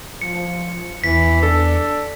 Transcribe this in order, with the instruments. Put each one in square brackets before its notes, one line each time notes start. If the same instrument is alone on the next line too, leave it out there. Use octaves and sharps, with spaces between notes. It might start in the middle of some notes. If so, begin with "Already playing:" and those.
[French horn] F3 [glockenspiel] C#7
[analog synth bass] E2 [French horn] E3 [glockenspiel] B6
[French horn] D4 [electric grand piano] A4